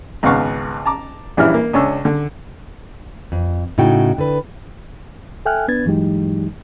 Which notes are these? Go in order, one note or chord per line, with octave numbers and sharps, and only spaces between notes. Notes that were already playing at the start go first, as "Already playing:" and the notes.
G#1 C#2 B3 F5 F#5 C#6
A5 A#5 D6
A#1 E3 G3 C#4 E4 F6
A#3
C#2 C#4 D4 C#6 E6
D3
F2
A2 C#3 D#4 F#4 G5
D3 B4
A4 E5 G5 G#5 F6 F#6
B3 D4 B4 G#6 A6
G2 E3 F#3 G#3 D#4 G4